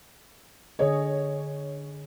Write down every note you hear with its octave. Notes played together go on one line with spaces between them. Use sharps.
D3 G#4 C#5 D#5